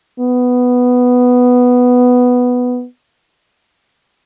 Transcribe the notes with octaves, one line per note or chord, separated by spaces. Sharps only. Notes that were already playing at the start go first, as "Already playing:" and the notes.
B3